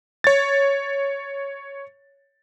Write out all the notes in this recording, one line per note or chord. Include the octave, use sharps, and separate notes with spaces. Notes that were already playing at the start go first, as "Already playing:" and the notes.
C#5 A6